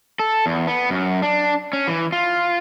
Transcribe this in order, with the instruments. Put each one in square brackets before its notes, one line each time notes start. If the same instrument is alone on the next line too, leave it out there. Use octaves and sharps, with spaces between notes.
[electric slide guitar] A4
E2
B3
F#2
D4
C#4
E3
F4